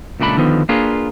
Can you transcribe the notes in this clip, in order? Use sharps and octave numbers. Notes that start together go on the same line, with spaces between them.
C#2 A#2 A3 D4 B5
D3 D#3 F3 B3
A#3 D4 F4 G#4 B4